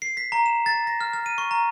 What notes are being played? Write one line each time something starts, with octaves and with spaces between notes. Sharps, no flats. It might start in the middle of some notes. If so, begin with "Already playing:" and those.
C7
B6
A#5
E7
A6
A#6
F6
F6
D#7
C#6
A#5